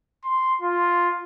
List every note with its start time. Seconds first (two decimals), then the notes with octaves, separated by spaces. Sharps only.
0.24 C6
0.61 F4